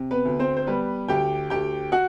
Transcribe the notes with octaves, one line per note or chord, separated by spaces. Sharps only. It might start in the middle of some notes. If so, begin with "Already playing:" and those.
Already playing: C3
B3 B4
D2
C4 C5
C5
G3 B3 B4
D2 G4 G5
D2 G4 G5
F#4 F#5